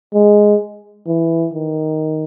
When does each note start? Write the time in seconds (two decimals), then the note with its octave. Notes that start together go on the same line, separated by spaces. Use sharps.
0.14 G#3
1.07 E3
1.54 D#3